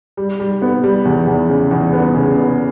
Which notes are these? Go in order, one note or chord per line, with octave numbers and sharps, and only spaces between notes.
G3
G3
B3
G3
E2
E2
C#3
E2
B3
C#3
B3